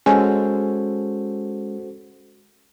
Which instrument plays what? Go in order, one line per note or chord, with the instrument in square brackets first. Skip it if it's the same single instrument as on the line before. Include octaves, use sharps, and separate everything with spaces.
[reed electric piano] G#3 C#4 [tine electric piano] F#4 A4 C5 [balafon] G#5